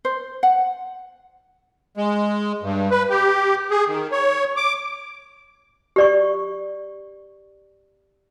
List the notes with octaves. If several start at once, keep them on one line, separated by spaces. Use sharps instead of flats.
C5
F#5
G#3
G2
B4
G4
G#4
D#3
C#5
D6
G4 D5 C#6